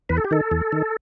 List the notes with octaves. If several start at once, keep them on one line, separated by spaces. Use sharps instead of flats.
E2 B4
A4
G4
D#3 A4
E2
D#3